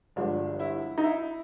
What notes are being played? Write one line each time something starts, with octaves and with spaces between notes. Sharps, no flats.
G1 G2 D3 F3 G#3 D4
E4
D#4
E4